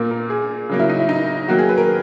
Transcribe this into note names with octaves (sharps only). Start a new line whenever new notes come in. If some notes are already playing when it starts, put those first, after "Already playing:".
Already playing: A#2 A#3
A#4
G#4
C#3 F#3 A#3
E4
D#4
E4
D#4
D#3 F#3 A#3 F#4
G#4
B4
A#4